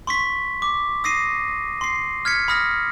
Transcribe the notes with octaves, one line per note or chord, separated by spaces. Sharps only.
C6 C#6 B6
D6
D#6 A#6 C7 D#7
C6 C7
F6 G#6 B6 C#7
B5 D#6 F6 A#6